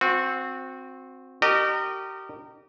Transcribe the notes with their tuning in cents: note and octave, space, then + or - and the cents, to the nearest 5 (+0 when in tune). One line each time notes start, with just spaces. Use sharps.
C4 +0 F#4 -25
G4 -30 A#4 -25 D#5 -35